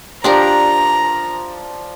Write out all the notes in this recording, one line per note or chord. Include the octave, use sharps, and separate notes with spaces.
F3 D4 G4 A#4 D5 A#5